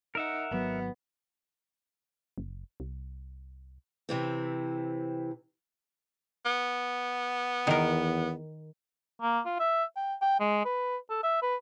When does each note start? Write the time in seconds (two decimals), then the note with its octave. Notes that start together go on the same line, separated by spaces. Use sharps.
0.15 D#4 A#4 E5 F#5
0.51 G#1 F#3 B3
2.38 F#1
2.80 C2
4.09 C3 E3 C4
6.46 B3
7.67 E2 D#3 A#4
9.22 A#3
9.46 F4
9.60 E5
9.96 G5
10.21 G5
10.40 G#3
10.65 B4
11.10 A4
11.23 E5
11.42 B4